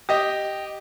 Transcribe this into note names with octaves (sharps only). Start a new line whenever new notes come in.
G4 D#5